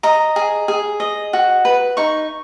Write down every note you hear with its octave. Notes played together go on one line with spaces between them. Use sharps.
D#5 A#5
G#4
G#4
D#5
F#4
B4
D#4 C#6